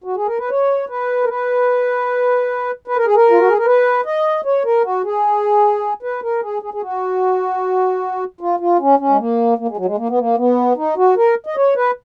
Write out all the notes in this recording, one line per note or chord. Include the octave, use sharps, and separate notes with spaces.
F#4
G#4
A#4
B4
C#5
B4
A#4
B4
B4
A#4
G#4
A#4
F4
F#4
G#4
A#4
B4
D#5
C#5
A#4
F#4
G#4
B4
A#4
G#4
G#4
G#4
F#4
F4
F4
C#4
C#4
G#3
A#3
A#3
G#3
F#3
G#3
A#3
B3
A#3
B3
D#4
F#4
A#4
D#5
C#5
B4